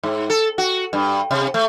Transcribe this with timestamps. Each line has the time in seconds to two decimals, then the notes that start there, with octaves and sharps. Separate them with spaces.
0.03 G#2
0.30 A4
0.58 F#4
0.93 G2
1.31 C3
1.54 A3